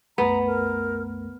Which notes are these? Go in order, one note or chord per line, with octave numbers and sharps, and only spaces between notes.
C2 F#2 A3 B3 A#5
A#4